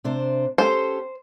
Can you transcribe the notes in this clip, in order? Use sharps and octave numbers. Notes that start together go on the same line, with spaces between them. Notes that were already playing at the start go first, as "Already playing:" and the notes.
C3 D4 C5
C#4 G4 A4 C5